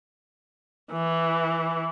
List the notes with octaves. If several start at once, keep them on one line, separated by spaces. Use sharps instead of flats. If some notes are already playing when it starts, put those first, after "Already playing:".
E3